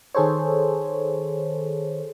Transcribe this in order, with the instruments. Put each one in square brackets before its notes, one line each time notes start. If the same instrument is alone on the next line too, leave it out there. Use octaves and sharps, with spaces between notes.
[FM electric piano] D#3 G#4 A4 C5 C#5